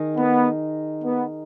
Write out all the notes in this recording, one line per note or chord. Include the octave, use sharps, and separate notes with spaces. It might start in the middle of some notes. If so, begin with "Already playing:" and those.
Already playing: D#3 D#4 G#4
B3
B3